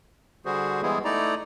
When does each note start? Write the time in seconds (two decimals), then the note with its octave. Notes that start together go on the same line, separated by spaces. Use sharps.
0.45 D3 G3 F#4 G#4 C5
0.82 E3 G3 G#3 B3 E4 G#4
1.04 A3 D#4 E4 D5 A#5